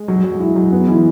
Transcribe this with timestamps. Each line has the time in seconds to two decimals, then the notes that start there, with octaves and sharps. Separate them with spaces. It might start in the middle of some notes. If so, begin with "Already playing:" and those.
Already playing: G#3
0.08 F#3
0.24 F#3
0.40 E4
0.56 F#3
0.72 B3
0.88 E3